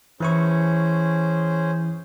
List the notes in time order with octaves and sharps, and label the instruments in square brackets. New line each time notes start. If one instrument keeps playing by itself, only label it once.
[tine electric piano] E3 E4 C#6 [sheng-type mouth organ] C#4 G#4 C5